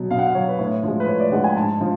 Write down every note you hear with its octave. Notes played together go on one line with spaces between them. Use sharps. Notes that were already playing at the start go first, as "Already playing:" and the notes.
Already playing: B2 F#3
B2 F5
F#5
F5
F#3 C#5
B4
A2 C#5
F3 G#3
B4
A2 C#5
D5
F3 G#3 F#5
G#5
G#2 A5
F3